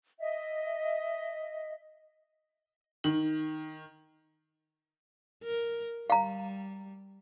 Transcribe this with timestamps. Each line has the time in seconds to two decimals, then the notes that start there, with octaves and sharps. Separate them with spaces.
0.19 D#5 E5
3.04 D#3 F#7
5.44 A#4
6.10 G3 F5 A#5